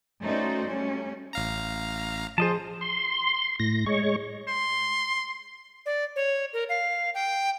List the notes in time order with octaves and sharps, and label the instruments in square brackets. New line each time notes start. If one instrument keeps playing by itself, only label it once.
[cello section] A3 C#4 D#4 F#4 C5 D5
G3 A3 C#4
[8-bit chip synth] A1 F5 A#5
[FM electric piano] F3 G#4 [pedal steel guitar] C5 D#5 A5
[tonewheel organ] C6
A2 A#6
G#3 C#5 C#6
[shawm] C6
[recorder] D5
C#5
A#4
F5
G5